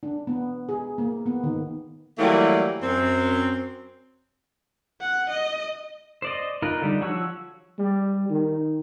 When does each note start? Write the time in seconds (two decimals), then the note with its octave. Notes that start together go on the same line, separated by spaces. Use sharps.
0.03 D4
0.27 B3
0.69 G#4
0.98 A#3
1.26 B3
1.43 D#3
2.18 E3 F#3 G3 A3 A#3
2.82 F#2 C4
5.00 F#5
5.30 D#5
6.22 C5 D5 D#5
6.62 D#4 F4 A#4 B4
6.81 D3 G3 D#4
7.01 F3 F#4 C#5 C#6 E6
7.79 G3
8.29 D#3